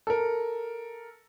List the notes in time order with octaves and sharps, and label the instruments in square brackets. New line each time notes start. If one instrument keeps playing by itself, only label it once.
[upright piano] A4 A#4